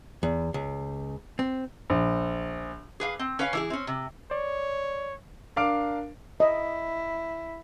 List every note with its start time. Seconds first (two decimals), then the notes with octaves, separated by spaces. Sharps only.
0.23 E2
0.54 C#2
1.39 C4
1.90 A#1
3.00 G#4 B4 F5
3.19 C4
3.39 C#4 B4 C#5 F5
3.53 E3 E4 G#4
3.70 C4 C#4
3.87 C3
4.31 C#5 D5
5.56 D4 A#4 F5 D6 F6 D7
6.40 E4 D#5